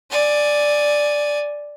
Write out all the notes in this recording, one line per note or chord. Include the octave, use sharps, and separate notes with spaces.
D5 G#5